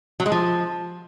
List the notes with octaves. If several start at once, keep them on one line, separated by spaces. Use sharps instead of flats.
F#3
G#3
F3